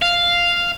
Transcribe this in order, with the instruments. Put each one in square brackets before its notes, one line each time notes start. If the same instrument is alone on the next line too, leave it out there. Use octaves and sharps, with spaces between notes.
[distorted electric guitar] F5